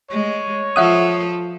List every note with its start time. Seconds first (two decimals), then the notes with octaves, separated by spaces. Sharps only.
0.10 G#3 C#5
0.76 F3 F4 A4 E5 F#5 D#6